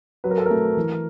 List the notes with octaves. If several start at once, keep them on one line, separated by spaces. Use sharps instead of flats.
F#3 B4
A#4
A4
A#4
A3
E3